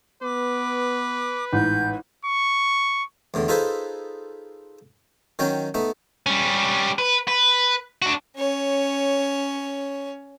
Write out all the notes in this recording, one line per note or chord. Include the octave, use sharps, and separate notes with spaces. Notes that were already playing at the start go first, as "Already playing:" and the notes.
B3 B4 D6
A1 G#2 G6
C#6
E2 A2 D3
D#4 F4 G#4 A4 B4 C5
D#3 F#3 C#4 G5
A3 B3 D#4
G3 C#4
B4
B4
D4 F#4
C#4 C#5